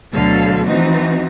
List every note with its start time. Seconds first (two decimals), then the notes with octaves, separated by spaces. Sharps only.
0.13 D2 B2 D3 F#3 A4 F5
0.66 E3 F3 C4 D#4 F#4